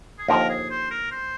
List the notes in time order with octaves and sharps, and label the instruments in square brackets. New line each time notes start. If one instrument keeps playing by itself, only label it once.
[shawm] G#4
[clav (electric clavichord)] D#2 D3 F3 [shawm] A#4
[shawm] G#4
C5
A#4
C5